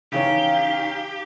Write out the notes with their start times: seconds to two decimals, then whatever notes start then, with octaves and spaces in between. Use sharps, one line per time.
0.13 C#3 E3 C#4 D#4 G4 F5